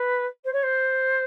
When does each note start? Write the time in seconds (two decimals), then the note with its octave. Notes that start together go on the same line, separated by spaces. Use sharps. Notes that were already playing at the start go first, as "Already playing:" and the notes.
Already playing: B4
0.44 C5
0.53 C#5
0.63 C5